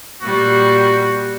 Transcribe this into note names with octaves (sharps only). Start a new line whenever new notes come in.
A#2 G3 F#4